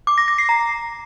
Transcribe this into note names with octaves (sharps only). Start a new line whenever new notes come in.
D6
A#6
A#6
C7
A#5